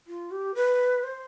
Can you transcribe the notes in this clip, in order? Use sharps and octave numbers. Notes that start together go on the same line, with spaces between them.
F4
G4
B4
C5